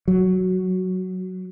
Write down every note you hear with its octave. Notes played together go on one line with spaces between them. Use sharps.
F#3